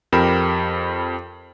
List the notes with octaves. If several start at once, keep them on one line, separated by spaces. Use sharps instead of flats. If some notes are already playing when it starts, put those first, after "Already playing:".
F2 G4 A#4 G5 B5 E7